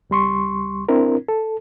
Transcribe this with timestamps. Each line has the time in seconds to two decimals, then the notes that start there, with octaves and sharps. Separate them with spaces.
0.10 C#2 G3 C6 C#6
0.89 C4 D4 E4 A#4
1.28 A4